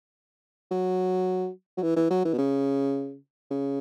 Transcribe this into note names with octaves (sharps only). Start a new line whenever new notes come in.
F#3
F#3
E3
E3
F#3
E3
B2
C#3
C#3